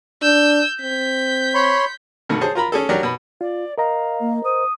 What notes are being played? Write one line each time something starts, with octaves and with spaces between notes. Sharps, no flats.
D4 E6 G6
C4 G6 B6
C#5 B5 C6
G2 B2 D3 D#3 A3
G#4 C5 C#5 A5
F4 A#4 A#5 B5
C#4 G#4 A4
F#3 D4 G4 A#4 C#5 D5
B2 B5
F4 D5
A#4 D#5 F5 A#5
A#3
C5 D#6